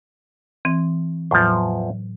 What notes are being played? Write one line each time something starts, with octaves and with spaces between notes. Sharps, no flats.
E3 C4
E2 A2 F3 F#3